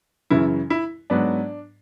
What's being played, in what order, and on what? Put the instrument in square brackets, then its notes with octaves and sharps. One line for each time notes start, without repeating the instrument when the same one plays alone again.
[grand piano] F#2 C#3 E3 E4
E4
G#2 F#3 B3 D4